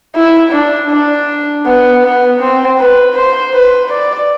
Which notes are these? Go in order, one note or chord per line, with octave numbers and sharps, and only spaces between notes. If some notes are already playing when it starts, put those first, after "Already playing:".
E4
D4
D4
B3
B3
C4
B4
C5
B4
D5